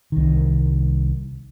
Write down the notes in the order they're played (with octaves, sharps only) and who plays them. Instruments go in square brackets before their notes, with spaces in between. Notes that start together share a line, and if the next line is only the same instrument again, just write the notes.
[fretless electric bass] C2 D#3